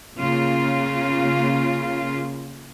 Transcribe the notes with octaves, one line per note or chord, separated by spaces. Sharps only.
C#3 A#3 F4